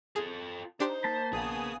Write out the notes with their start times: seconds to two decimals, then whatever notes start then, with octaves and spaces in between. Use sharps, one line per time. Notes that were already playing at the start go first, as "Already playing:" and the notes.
0.16 F4 G#4 A4
0.80 D4 D#4 G4 C5 C6
1.04 A#3 A5 B5
1.33 A#1 B3 G#4 F5 G#5 D#6